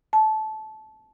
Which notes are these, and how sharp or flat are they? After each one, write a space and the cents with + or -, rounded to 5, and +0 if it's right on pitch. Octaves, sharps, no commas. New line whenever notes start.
A5 -20